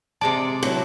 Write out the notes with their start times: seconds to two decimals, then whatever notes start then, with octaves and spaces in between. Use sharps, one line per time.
0.21 C3 G#3 D5 A5
0.63 F#3 E4